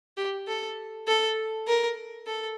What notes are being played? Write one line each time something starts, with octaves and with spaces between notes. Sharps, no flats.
G4
A4
A4
A#4
A4